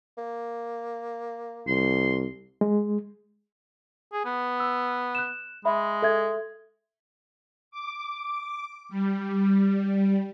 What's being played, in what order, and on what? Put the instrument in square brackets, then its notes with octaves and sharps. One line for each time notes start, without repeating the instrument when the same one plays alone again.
[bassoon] A#3
[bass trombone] C2 [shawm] C6
[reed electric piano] G#3
[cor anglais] G#4
B3
[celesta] E6
F#6 E7
[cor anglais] G#3 [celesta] E5 B5
[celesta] A4 E5 G#6
[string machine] D6
G3